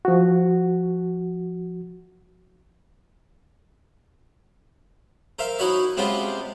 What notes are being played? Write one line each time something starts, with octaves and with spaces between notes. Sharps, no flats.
F3 F#4
A#4 C5 E5 F5
D#4 E4 F#4 C#5 E5
C3 G#3 B3 C#4 F4 G4